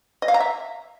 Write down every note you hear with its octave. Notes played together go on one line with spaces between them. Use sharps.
D#5
F5
A#5
E5